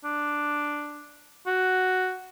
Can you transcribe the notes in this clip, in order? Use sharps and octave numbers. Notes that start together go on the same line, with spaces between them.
D4
F#4